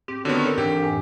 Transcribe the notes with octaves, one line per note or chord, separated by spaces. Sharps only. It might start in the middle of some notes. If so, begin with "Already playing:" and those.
G#2 C4 G4
D3 D#3 B3 F#4 C#5
A4 A#4
G#2 E3 D4 G4 A4
F#2 A2 G#5